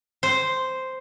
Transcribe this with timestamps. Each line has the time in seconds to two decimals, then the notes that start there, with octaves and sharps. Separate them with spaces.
0.23 C5